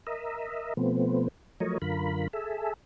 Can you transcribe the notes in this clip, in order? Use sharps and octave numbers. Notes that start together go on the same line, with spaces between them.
A#4 D#5 E5
B2 F3 A3 B3 C4
F3 F#3 A3 A#4 C#5 D#5
F#2 D3 F4 A#4 B5
G#4 A4 E5